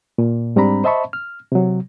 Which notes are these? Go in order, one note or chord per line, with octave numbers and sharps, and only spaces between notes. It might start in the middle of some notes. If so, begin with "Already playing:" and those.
A#2
G#2 G3 C4 D4 A#5 B5
C5 D#5 E5 A5 B5 C#6
F6
C3 F#3